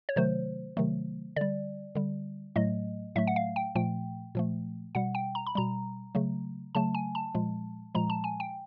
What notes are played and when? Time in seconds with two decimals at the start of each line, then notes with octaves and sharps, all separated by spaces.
0.09 C#5
0.16 C3 D#3 F#3 A3 C5
0.77 C3 D#3 F#3 A3
1.36 D3 G3 D5
1.95 D3 G3
2.56 A2 F#3 A3 D#5
3.16 A2 F#3 A3 E5
3.27 F#5
3.36 F5
3.56 G5
3.75 A#2 F3 A3 G5
4.35 A#2 F3 A3
4.95 B2 G3 F#5
5.15 G5
5.35 A#5
5.47 B5
5.55 B2 G3 A#5
6.15 C#3 F#3 A3
6.75 C#3 F#3 A3 A5
6.95 G#5
7.15 A5
7.34 A#2 F3 G#3
7.95 A#2 F3 G#3 A#5
8.10 A5
8.24 G#5
8.40 G5